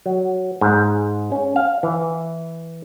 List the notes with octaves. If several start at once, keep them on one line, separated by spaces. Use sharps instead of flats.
F#3
G#2
C#4
F5
E3